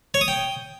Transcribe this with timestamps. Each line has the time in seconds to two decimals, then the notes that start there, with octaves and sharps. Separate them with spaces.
0.14 C#5
0.21 D#6
0.28 G5